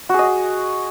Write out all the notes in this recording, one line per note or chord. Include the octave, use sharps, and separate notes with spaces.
F#4 G#4 D#5